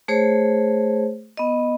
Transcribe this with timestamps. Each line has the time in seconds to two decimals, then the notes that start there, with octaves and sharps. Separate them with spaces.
0.08 A3 G#4 C5 C#5
1.37 B3 D#5